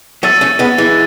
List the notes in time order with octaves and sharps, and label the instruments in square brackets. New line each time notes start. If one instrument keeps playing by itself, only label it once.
[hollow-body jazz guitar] F#3 A3 [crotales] E6 A6 D#7
[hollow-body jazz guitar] A3 C#4
G#3 B3
E3 G#3